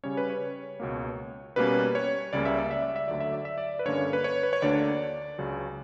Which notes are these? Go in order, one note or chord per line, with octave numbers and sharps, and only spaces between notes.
C#3 G3 C#4 C#5
B4
C#5
C#2 B2 A#3
B2 G3 A#3 C#4 B4
C#5
C#2 C#3 G3 A#3 D5
E5
D5
E5
D5
E5
D2 D3 F#3 D5
E5
D5
E5
D5
B4
G2 D3 A#3 C#4 C#5
B4
C#5
B4
C#5
D2 D3 A#3 D4 D5
C#2 C#3 F#3